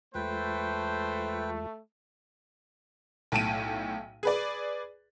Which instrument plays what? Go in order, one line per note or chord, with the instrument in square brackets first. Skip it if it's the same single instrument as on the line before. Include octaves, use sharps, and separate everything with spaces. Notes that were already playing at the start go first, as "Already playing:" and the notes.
[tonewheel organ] E2 G#3 F4 [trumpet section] A3 [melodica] B4 G5 [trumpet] C5
[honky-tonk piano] B1 A2 A5 D7 D#7
G#4 B4 D5